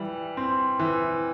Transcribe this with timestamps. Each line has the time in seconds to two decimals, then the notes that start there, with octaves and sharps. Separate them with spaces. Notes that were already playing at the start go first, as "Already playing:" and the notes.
Already playing: E3 G3
0.37 C4
0.79 E3